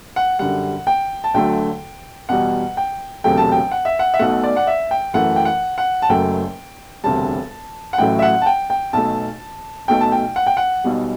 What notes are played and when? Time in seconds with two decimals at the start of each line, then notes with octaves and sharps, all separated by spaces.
0.16 F#5
0.39 F#2 D3 G3 F#5
0.87 G5
1.24 A5
1.34 D2 D3 F#3 A3 G5
2.29 E2 B2 G3 F#5
2.77 G5
3.24 E1 D2 C3 F#3 A3 G5
3.37 A5
3.52 G5
3.71 F#5
3.85 E5
3.99 F#5
4.14 E5
4.19 B1 B2 A3 F#5
4.43 D5
4.57 F#5
4.67 E5
4.91 G5
5.14 F#2 E3 A3 F#5
5.36 G5
5.45 F#5
5.78 F#5
6.02 A5
6.09 F#1 F#2 F#3 A3 G5
7.03 E1 D2 C3 G3 A5
7.93 F#5
7.98 A1 A2 F#3 A3 G5
8.19 E5
8.22 F#5
8.42 A5
8.46 G5
8.70 G5
8.93 B1 B2 A3 A5
9.88 B1 B2 A3 G5
10.01 A5
10.12 G5
10.36 F#5
10.47 G5
10.57 F#5
10.84 B1 B2 G3